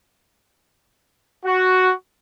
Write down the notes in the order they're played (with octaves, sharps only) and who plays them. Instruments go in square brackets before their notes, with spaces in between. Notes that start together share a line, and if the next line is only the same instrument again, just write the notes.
[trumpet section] F#4